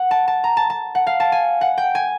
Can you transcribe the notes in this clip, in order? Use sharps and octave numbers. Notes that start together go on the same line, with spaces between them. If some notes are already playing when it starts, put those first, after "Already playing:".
Already playing: F#5
A5
A5
A#5
A5
A5
F#5
F5
A5
G#5
F#5
G5
G#5